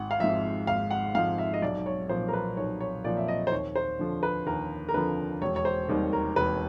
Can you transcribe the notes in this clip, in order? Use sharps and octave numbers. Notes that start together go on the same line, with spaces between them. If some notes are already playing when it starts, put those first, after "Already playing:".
Already playing: G#1 F#5
F5
G#2 F3 E5
G#1 F5
F#5
G#2 F3 F5
E5
D#5
B1 D5
C#5
A#2 F3 C5
A#4
B4
B1 C#5
C#5
A#2 F3 D5
E5
D#5
C5
D#2 C#5
C5
D3 F3
B4
D#2 A#4
A#4
D3 F3 B4
E1 C#5
C#5
C5
D#2 D#3 G3
A#4
E1 B4